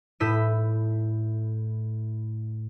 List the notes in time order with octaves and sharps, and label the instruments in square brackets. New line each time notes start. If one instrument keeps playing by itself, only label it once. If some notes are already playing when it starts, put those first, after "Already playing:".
[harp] A2 E4 E6 G6 B6 D#7